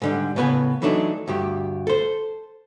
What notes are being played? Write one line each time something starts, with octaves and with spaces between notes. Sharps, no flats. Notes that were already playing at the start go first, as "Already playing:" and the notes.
G#2 D3 G3
A2 C#3 B3 B4 G#5
E3 F#3 A3 D4 D#4
D2 G2 G4
A4 C5